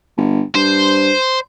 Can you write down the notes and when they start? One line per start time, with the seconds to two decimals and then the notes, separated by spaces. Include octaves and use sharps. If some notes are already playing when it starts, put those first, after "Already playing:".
0.17 G1
0.55 G2 C5